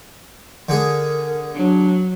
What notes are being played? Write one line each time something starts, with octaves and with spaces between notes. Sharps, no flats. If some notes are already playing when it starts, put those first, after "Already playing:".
D3 G#4 A#4
F#3 D4